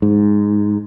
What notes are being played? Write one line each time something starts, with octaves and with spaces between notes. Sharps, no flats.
G#2